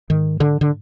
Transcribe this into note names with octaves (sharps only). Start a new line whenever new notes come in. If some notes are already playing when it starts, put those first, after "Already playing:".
G#2 D#3
D3
D3